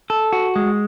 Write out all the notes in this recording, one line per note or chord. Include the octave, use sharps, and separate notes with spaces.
A4
F#4
G#3